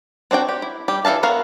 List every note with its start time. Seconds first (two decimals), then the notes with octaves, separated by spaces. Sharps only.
0.31 C4 D4 F#4 G5
0.49 G4
0.62 E4
0.88 G3 G4
1.05 E3 A4 E5 F5 A5
1.23 B3 F#4 A#4 F5